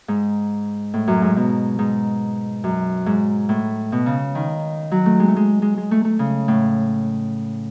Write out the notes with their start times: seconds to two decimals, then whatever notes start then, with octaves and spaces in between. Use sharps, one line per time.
0.08 G#2
0.94 A2
1.08 F#2
1.22 G#2
1.36 B2
1.79 G#2
2.64 F#2
3.06 G#2
3.49 A2
3.92 B2
4.06 C#3
4.35 D#3
4.91 F#3
5.06 A3
5.20 G#3
5.28 A3
5.36 G#3
5.62 G#3
5.77 G#3
5.91 A3
6.05 A3
6.19 C#3
6.48 A2